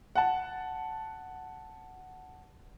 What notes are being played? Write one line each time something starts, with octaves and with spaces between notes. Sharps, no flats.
F#5 A5